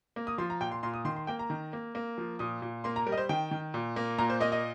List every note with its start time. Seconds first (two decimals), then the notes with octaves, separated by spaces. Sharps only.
0.16 A#3
0.27 D#6
0.38 F3 C6
0.50 A#5
0.61 A#2 G5
0.71 C6
0.83 A#2 C6
0.94 D#6
1.05 D#3 C6
1.16 C6
1.27 A#3 G5
1.39 A#5
1.50 D#3
1.73 A#3
1.95 A#3
2.18 F3
2.39 A#2 D#6
2.62 A#2
2.84 A#3 C6
2.96 A#5
3.07 G3 A#4
3.12 D#5
3.18 C5
3.29 D#3 G5
3.51 D#3
3.74 A#2
3.96 A#3
4.18 A#2 A#5
4.30 C5
4.40 A#3 D#5
4.52 D#5